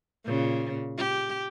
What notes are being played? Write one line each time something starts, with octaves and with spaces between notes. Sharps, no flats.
A#2 C#3
G4